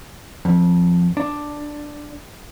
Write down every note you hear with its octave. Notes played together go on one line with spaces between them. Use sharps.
F2
D4